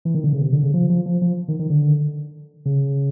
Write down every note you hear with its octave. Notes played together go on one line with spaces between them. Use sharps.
E3
D#3
D3
C#3
C3
D3
C#3
F3
F3
F3
F3
D#3
D#3
D3
C#3